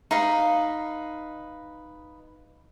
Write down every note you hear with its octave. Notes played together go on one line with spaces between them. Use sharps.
D#4 B4 F5